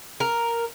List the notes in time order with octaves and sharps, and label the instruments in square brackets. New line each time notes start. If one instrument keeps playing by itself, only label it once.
[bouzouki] A#4